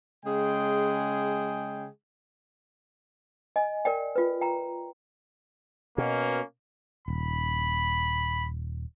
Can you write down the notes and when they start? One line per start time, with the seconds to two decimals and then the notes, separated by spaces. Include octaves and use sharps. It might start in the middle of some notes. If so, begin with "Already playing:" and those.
0.24 C#3 G#3 G#4 G5
3.56 D#5 G#5
3.85 A#4 D5 G5
4.16 F4 B4
4.41 G5 A#5
5.98 B2 A#3 C#4
7.08 D#1 B5